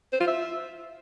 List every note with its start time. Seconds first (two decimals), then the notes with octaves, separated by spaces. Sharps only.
0.13 C5
0.20 F4
0.28 E5